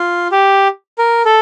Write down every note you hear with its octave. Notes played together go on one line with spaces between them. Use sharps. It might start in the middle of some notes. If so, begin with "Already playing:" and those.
Already playing: F4
G4
A#4
A4